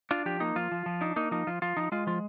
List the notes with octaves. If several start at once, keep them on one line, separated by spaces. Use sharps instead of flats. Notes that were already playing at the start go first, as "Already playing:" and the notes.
D4 F4
F3 G4
A#3 D#4
F3 F4
F3
F3
D4 D#4
A#3 D#4
F3 D#4
F3 F4
F3 F4
F3 D#4
G#3 F4
F3 F4